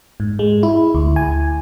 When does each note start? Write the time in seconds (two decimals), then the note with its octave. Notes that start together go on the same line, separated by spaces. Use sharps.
0.20 G#2
0.39 G#3
0.63 E4
0.95 D2
1.16 G#5